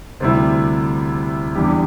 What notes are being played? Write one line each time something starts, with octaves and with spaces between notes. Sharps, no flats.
D2 C3 G3 E4
E2 E3 G3 D4 G4